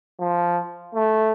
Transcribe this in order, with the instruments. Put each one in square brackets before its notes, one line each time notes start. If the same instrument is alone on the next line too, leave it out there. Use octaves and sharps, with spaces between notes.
[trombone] F3
A3